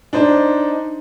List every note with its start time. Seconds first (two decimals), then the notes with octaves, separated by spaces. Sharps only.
0.13 D4 D#4 C5